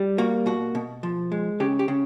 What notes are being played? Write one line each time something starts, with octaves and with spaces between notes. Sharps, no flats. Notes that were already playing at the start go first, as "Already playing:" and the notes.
Already playing: G3
A#3 F#4
B2 F#4
B2
F3
G#3
C#3 G4
G4
C#3